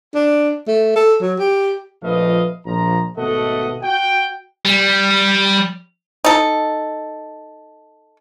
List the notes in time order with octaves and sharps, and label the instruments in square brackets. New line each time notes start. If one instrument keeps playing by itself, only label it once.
[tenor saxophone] D4
A3
A4
F#3
G4
[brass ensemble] A#1 F3 A3 B4 D#5 F5
A#1 F3 A#5
G#1 B2 A3 A4 D#5 F#5
F#4 G5
[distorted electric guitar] G3
[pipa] D#4 A4